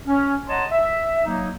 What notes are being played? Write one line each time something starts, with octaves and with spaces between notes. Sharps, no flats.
C#4
C#5 D#5 F#5 A5 A#5 C6
E5
F#3 A#3 D#4